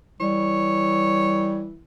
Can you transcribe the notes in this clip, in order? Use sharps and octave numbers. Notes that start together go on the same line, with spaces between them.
E3 G3 C#5